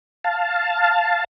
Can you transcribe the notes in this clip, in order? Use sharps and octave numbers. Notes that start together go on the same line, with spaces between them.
F5 A5